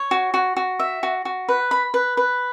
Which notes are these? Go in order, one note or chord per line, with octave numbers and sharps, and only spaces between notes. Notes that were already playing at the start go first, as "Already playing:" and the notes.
Already playing: C#5
F#4
F#4
F#4
E5
F#4
F#4
B4
B5
B4
B4